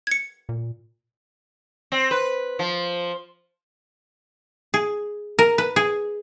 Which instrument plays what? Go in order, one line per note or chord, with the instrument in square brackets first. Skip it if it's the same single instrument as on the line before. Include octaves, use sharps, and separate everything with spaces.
[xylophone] G#6 C#7
[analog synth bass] A#2
[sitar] C4
B4
F3
[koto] G#4
A#4
B4
G#4